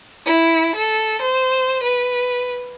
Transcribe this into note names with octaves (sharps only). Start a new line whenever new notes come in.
E4
A4
C5
B4